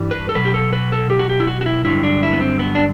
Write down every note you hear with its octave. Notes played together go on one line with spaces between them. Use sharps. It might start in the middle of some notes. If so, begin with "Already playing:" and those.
Already playing: G2 E3 G3
B4
A4
B2 F#3 B4
G4
A4
B4
A4
G4
F#4
G4
E4
F#4
F#4
E4
G2 D3 F#3 E4
D4
E4
B3
C4
B3
D4